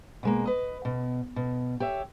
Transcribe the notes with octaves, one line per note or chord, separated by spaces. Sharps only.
B2 G#3 A#3
B4 D#5
B2
B2
G4 C#5 E5